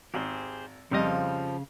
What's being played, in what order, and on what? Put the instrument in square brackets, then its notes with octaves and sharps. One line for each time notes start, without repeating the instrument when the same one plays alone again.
[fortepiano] G#1 [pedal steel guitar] G4 G#4 C5
[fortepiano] F2 G3 D#5 [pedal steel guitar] C#3 F5 [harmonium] F3